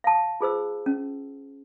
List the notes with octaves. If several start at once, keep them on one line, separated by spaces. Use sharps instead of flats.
F5 A5
F4 G#4 C5 E6
C#4